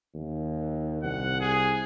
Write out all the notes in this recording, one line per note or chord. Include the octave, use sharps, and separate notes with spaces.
D#2
C2 F#5
G#4